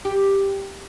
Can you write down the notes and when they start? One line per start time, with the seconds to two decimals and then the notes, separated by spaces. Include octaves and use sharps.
0.05 G4